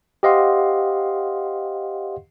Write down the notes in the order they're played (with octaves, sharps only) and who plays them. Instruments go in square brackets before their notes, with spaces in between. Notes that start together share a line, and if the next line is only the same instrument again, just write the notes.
[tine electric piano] G4 C5 D#5 F5 F#5 C6